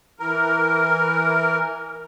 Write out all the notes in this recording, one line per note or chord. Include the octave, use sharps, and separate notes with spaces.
E3 A#4